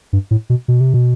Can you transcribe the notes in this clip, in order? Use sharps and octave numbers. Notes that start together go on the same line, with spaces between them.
G2
A2
B2
B2
C3
B2